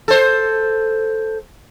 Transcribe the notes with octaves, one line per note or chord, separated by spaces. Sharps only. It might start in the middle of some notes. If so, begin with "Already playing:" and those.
A4 C5